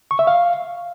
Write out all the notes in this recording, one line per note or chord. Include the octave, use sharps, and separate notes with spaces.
C#6
E5
F5